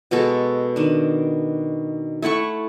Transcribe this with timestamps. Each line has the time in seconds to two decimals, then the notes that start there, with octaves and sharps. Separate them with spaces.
0.11 B2 G#3 F#4 A4
0.76 D#3 D4
2.22 A3 E4 F#5 C#6